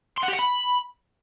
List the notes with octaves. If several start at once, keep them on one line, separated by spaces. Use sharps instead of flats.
C6
F#5
G4
F#5
B5